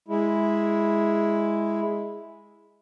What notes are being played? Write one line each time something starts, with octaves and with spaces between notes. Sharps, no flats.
G#3 E4